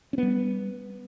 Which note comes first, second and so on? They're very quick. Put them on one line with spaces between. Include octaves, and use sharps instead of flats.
C#4 B3 G3